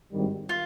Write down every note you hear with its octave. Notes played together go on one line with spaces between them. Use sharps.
G#1 G2 D#3 G3
F4